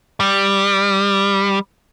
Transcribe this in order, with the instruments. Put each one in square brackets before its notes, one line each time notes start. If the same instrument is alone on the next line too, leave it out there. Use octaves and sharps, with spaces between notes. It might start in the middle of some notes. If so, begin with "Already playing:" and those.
[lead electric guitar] G3